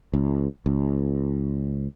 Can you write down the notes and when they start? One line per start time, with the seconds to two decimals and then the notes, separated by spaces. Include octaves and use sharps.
0.14 C#2
0.66 C#2